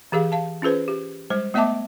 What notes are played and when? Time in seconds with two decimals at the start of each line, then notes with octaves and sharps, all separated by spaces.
0.12 E3 G4 G#4 F5
0.32 F5 A5
0.62 C#4 F4 G#4 B4 C5
0.88 G4
1.30 G3 G#3 C5
1.54 A3 B3 D#5 E5 A5 D6